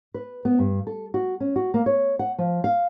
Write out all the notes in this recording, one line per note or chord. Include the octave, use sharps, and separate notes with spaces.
B4
B3
G2
A4
F#4
C#4
F#4
A#3
C#5
F#5
F3
F5